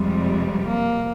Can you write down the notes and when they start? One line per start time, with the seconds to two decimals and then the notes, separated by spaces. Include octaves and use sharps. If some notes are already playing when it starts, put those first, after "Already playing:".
Already playing: F2 C3 G3 G#3
0.65 A#3